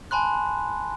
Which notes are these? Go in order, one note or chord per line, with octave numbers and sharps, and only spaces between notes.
G#5 A5 B5 C6 F#6